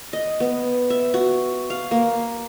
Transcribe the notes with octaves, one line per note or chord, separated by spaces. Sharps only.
D#5
B3
E5
F#4
F5
A#3